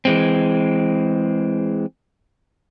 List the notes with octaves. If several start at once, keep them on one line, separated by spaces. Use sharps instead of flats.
E3 G#3 C4